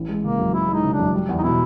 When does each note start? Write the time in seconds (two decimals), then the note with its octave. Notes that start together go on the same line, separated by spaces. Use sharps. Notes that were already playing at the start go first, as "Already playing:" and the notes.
Already playing: A1 E3
0.08 G#3
0.24 C#3 A#3
0.39 F#2
0.53 E3 E4
0.69 G#3
0.74 D#4
0.84 C#3
0.93 D4
0.99 F#2
1.14 G3
1.29 E2
1.38 D#4
1.43 B2 E4